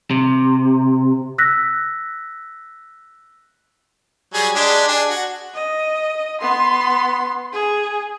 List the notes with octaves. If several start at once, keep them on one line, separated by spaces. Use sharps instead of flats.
C3
E6 F#6 A#6 B6
F#3 G3 G#4
G#3 D4 G4
D4 G#4
F#4
D#5
B3 C6
G#4